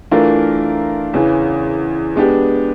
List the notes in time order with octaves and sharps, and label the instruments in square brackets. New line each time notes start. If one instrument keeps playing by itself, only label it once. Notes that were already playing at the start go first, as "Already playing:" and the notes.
[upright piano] E3 A3 D4 F4 A#4
E2 C#3 E3
G#3 B3 D4 G4